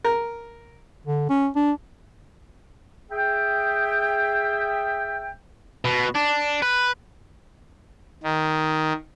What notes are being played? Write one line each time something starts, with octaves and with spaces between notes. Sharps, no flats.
A#4
D3
C#4
D4
G#4 E5 G5
B2
D4
B4
D#3